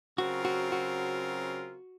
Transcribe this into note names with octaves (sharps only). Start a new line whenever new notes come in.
C#3 F#3 C4 F4 F#4 A#4
F#4
F#4